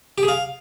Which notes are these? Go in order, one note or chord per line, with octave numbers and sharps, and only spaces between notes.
G4
G#4
F5